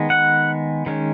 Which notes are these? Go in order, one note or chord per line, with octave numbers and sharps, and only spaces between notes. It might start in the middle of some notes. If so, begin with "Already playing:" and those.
Already playing: D#3 G#3 B3
F#5
D#3 G#3 C#4